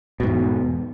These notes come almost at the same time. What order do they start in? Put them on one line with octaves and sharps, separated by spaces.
B2 G#2 E2